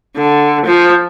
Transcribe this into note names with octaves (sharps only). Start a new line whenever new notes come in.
D3
F3